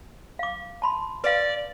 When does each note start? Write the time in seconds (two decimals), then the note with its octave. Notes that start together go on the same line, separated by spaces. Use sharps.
0.39 F5 D6
0.82 A5 B5 C6
1.24 B4 D5 F5